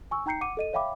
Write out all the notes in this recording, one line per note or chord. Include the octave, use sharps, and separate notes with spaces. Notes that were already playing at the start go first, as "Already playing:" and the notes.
G#5 C#6 E6
D#4 G5 A#5 G6 C7 C#7
F#5 D6 C#7 D#7
A4 D#5 D#7
C#5 E5 F5 G5 B5 D6